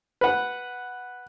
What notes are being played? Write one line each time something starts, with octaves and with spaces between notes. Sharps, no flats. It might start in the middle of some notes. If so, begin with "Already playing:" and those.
B4 F#5